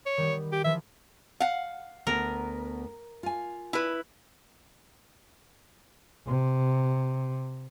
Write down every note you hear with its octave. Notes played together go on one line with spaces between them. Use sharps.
C#5
D#3 G3 B3
G4
E3 F3 B4 E5
F5 F#5
D2 B3 A#4
F4 G#5
E4 B4
C3